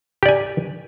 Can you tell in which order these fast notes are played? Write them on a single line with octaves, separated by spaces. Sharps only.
G4 D5 G#5